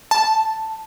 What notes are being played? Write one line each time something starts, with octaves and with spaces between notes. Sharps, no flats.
A5